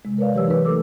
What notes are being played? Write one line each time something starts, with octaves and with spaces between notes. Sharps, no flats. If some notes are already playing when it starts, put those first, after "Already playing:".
C3 G#3
A#4 B4 C#5 D5 F5
E3 F#3 G4 B4 C#5 E6
D#4 A#4 B4
F#3 A3 A4 D6 E6